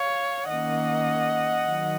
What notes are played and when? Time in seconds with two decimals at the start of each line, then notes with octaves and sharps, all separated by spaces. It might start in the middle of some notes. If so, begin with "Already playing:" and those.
Already playing: C#5 F5
0.47 D#3 A#3 C#4 D#5 F#5
1.67 D#3 F#3